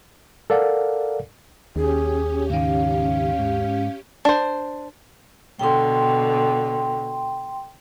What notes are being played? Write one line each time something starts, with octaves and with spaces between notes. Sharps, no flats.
A4 A#4 D5 F5 F#5
D#2 C#4 G4 G#4
C#2 G#2 D#3 F5
G#2
D4 C5
B2 D3 G5 C6